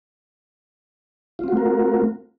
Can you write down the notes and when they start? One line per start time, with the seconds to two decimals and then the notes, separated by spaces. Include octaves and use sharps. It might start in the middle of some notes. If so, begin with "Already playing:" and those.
1.39 F4
1.44 C4
1.48 F#4
1.53 A3
1.57 A#4